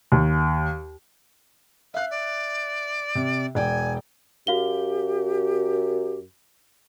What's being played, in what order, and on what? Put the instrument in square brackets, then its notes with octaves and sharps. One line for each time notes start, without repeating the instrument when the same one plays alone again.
[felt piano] D#2
[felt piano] E5 F#6 [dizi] F5
[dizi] D5
[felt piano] C3
[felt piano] E1 D5 G5 [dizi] G#5
[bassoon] F#2 [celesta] F#4 F5 G7 [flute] G4